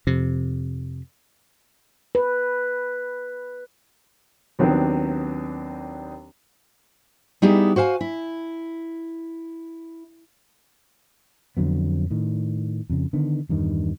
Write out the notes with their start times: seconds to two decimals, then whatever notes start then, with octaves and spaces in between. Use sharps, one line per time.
0.07 F2 C3
2.15 B4
4.59 D#2 D#3 F#3 B3 C4 D4
7.42 G3 B3 D#4 E4 G4 G#4
7.76 F#4 C5 F5 G#5
8.01 E4
11.57 F2 D3 F#3 B3
12.11 A2 D#3
12.90 F2 C#3
13.13 D3 D#3 B3
13.49 E2 G2 D#3